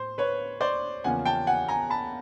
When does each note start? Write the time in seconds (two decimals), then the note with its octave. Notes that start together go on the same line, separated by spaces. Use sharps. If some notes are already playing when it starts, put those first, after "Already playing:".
Already playing: A2 C5
0.18 B4 C#5
0.61 C5 D5
1.04 E2 C#3 F3 A#3 C#4 F#5 G#5
1.26 G5 A5
1.47 F#5 G#5
1.68 G#5 A#5
1.90 A5 B5